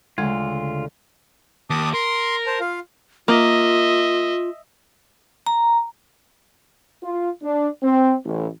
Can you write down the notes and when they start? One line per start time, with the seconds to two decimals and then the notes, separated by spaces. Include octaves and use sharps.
0.18 D2 C#3 G#3 F4
1.70 D#2 A5 D6 D#6
1.94 A#4 C6
2.47 C5 A5
2.60 F4 F5
3.28 A#3 F4 D#5 E5
5.46 A#5
7.03 F4
7.43 D4
7.82 C4
8.25 A1